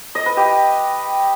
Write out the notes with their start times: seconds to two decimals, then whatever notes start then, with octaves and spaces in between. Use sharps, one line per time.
0.15 D#5
0.26 B4
0.37 G4